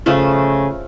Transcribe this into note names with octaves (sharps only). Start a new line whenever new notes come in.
C#3 F3 A3